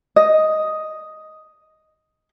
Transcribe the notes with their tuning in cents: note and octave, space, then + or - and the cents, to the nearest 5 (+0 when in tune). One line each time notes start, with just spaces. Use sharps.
D#5 +5